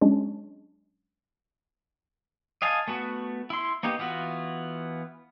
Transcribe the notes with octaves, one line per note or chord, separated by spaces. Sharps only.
F#3 G#3 C#4 D4
D#5 F5 G#5 A5
A3 B3 F#4
E4 C6
A#3 B3 D#4 G4
E3 B3 F4 F#4